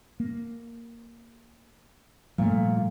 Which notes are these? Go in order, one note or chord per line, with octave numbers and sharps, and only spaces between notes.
A#3
A#2 F3 G3 A3